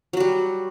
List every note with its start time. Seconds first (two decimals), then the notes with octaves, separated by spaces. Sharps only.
0.13 F#3
0.17 F#4
0.20 G3